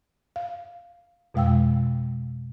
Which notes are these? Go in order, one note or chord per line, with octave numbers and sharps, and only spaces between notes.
F5
F2 B2 G#3 F5 G5 E6